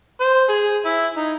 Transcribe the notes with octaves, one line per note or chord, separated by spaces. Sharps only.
C5
G#4
E4
D#4